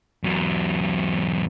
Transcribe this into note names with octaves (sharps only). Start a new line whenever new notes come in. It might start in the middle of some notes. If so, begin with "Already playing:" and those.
E2 F#3